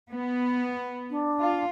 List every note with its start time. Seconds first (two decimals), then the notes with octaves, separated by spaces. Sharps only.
0.11 B3
1.10 D4
1.40 F4